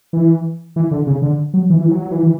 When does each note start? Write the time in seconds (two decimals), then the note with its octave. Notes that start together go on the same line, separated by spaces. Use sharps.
0.13 E3
0.76 E3
0.91 D3
1.07 C#3
1.22 D3
1.54 F#3
1.70 E3
1.81 E3
1.91 F#3
2.02 F#3
2.11 E3
2.23 E3